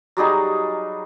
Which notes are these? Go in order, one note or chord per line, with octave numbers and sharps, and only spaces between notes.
F#3 G3 D#4 G#4